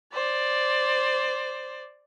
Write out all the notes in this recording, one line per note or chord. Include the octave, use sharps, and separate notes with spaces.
C5 D5